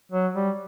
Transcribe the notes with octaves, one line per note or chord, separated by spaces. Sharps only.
F#3
G3